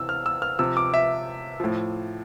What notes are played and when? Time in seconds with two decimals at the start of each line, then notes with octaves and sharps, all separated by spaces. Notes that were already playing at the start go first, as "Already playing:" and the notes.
Already playing: C3 E3 E6
0.09 F6
0.26 E6
0.42 F6
0.59 C3 F3 E6
0.77 D6
0.94 E5
1.60 A2 F3